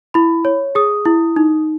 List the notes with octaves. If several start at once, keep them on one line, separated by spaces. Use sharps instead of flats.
E4 B5
C#5
G#4 D#6
E4
D#4